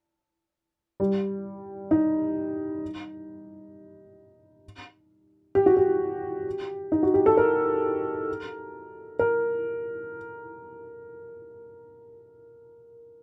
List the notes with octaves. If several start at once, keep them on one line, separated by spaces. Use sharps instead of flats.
G3
D#4
G4
F#4
G4
D#4
F#4
G4
A4
A#4
A#4